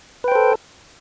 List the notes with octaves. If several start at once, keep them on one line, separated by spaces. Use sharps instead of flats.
A4 B4 C5 G5